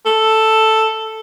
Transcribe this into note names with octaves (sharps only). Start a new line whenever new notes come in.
A4